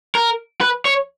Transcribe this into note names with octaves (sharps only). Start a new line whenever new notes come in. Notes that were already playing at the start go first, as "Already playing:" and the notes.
A#4
B4
C#5